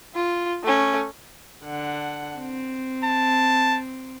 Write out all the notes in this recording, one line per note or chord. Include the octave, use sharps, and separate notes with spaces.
F4
A3 C#4
D3 F#5
C4
A5